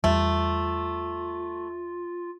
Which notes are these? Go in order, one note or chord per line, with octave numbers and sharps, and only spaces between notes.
E2 G3 A3 F4